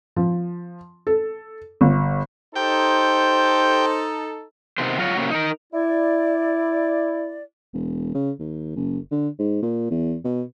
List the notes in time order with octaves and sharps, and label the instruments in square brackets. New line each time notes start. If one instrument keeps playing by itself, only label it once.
[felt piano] F3
A4
G1
[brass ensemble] D#4 A4 [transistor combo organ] G4 G5 [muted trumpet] C5
[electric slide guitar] C3 D#3 B3 C5
F#3 F4 F#4 C#5
C3 D#3 F#3 A#3 C#4
D#4 A#4
[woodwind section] E4 D5
[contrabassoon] E1
C#3
D#2
F#1
D3
G#2
A#2
E2
B2